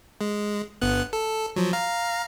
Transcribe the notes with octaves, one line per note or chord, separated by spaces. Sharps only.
G#3
G1 B3 F#6
A4
F3 F#3
F5 A#5